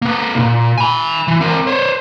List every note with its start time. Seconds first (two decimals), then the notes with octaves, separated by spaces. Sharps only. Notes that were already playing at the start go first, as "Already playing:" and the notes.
0.02 A#3 B4
0.35 C2 A#2
0.78 G#5 B5
1.28 E3
1.41 C4 A#4
1.67 C5 C#5